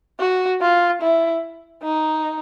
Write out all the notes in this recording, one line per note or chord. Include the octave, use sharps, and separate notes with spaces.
F#4
F4
E4
D#4